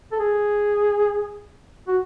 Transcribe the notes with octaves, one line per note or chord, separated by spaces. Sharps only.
A4
G#4
F#4